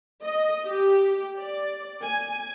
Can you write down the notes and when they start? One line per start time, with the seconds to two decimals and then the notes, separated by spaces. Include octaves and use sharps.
0.23 D#5
0.65 G4
1.37 D5
2.03 G#5